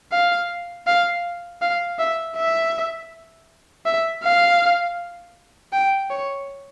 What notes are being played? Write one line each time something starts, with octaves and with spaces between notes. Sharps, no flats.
F5
F5
F5
E5
E5
E5
F5
G5
C#5